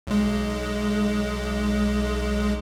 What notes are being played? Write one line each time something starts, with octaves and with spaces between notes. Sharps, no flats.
B1 G#3